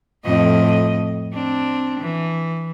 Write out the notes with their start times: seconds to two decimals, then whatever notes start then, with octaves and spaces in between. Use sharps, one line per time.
0.25 F2 A2 D#5
1.33 C4 D4
2.00 E3